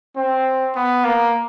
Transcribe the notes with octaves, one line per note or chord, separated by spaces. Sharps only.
C4
B3
A#3